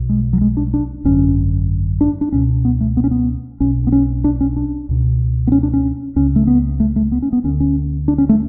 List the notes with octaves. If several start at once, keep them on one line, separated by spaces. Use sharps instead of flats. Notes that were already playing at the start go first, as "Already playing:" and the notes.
Already playing: B1 B2
G#3
F#3
G#3
D4
D4
G#1 F#2 D3 C#4
D4
D4
C#2 B2 C#4
B3
A3
B3
C#4
B3
B1 B2 C#4
B3
C#4
D4
C#4
D4
C#2 B2
B3
C#4
D4
C#4
C#2 C#3 C#4
A3
B3
A3
A3
B3
C#4
B3
D2 D3 C#4
C#4
D4
C#4
A3